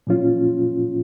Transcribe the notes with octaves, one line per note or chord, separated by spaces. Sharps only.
A#2 F3 C#4 F4